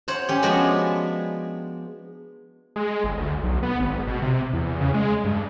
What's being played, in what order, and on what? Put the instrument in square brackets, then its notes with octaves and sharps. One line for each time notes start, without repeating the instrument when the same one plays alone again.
[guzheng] C5 C#5 F#5
C#4 G4
F3 G#3 B3 D4 F#4
[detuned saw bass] G#3
G1
D2
B1
B3
G#1
B2
C3
E2
C#3
G#3
G2